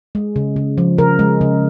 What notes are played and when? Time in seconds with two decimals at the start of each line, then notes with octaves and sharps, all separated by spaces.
0.15 G#3
0.36 C#3
0.56 C#3
0.78 F3
0.98 C#3 A#4
1.19 G#3
1.41 C#3